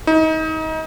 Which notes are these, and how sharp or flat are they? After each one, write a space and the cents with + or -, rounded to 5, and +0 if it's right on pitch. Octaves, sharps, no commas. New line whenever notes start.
D#4 +30